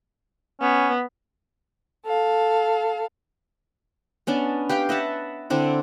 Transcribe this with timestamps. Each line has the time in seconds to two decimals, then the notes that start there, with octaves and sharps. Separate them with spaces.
0.61 B3 C#4
2.05 A4 F5
4.27 B3 C#4 D4 A5
4.69 G4 B4 F5 G5
4.89 D#5 E5 F#5 A5
5.50 D3 C4 D4 E4